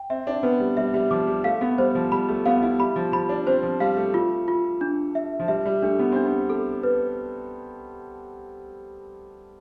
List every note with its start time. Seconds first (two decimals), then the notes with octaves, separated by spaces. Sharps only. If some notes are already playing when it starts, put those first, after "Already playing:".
Already playing: G5
0.10 C4 E5
0.27 D4
0.43 B3 B4
0.60 G3
0.77 G3 E5
0.94 G3
1.11 F3 D6
1.27 G3
1.44 A3 F5
1.61 B3
1.78 G3 C5
1.95 F3
2.12 G3 B5
2.28 A3
2.46 B3 F5
2.62 E4
2.79 G3 B5
2.96 F3
3.12 F3 B5
3.29 D4
3.46 C4 C5
3.63 F3
3.80 G3 F5
3.97 A3
4.14 F4
4.48 F4
4.81 D4
5.15 E5
5.40 F3
5.48 G3 E5
5.65 G3
5.82 A3 D4
5.99 B3
6.12 C4 D4
6.25 B3
6.50 A4
6.83 B4